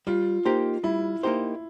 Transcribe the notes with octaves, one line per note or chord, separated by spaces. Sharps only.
G3 F4
A#3 D#4 G4 C5
G3 E4
A#3 D#4 G4 C5